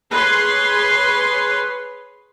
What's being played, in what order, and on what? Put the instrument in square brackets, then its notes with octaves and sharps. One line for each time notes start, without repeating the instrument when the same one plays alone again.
[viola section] G#4 B4 C#5 C6